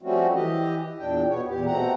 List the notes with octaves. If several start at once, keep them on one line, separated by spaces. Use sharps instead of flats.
F3 G3 A3 C4 C#4 F#4
E3 G4 D#5
E2 A#2 D4 G5
B2 B3 C#5
E2 A#2 G4
B2 A3 C4 F#5 A#5